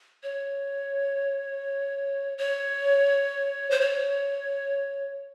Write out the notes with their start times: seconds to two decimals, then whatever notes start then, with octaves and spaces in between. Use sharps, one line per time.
0.23 C#5
2.38 C#5
3.71 C5
3.81 C#5